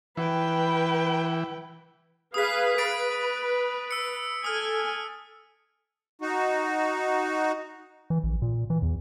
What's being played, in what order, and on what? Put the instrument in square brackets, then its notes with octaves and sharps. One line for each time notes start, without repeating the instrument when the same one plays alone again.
[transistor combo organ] E3 [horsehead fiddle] B4 G5
[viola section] G#4 B4 F5 [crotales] D#6 B6
[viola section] B4 [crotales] D#6 A6 D7
[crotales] E6 C#7
[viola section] A4 G#5 [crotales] D#6 F6
[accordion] D#4 F#4
[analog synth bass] E3
A#1
A#2
E3
E2